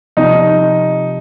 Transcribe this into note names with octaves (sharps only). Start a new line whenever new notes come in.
C3 F3 D#4